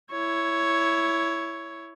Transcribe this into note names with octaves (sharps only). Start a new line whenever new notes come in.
E4 C#5